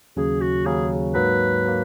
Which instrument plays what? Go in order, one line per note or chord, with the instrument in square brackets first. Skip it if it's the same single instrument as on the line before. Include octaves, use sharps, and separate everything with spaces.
[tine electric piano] D#2 C#3 F#3 C#4 [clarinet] G#4
[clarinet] F#4
[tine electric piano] D#2 C#3 F#3 C#4 [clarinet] G#4
[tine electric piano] G#2 F#3 A#3 [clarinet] B4
[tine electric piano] F#3 A#3